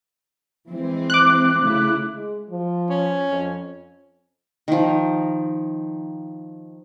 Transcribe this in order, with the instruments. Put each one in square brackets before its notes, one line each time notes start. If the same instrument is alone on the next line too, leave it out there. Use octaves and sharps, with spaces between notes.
[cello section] E3 G#3 C4
[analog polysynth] D6 F#6
[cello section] C#3 A3 E4
[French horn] G#3
F3
[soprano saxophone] C#4
[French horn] F2
[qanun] D#3 F3